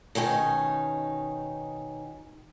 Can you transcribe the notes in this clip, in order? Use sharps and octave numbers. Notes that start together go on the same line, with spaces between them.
B2 D#3 C#4 D#4